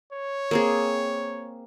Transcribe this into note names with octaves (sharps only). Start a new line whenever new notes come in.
C#5
A#3 C4 G#4